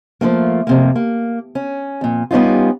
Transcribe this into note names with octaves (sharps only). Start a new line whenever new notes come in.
F3 F#3 A3 A#3
F2 C3 A#3
A#3
C#4
F2 A#2
G3 B3 C#4 D#4 F4